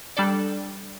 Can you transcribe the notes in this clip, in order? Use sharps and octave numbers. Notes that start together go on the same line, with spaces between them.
G3 D4 A4 D5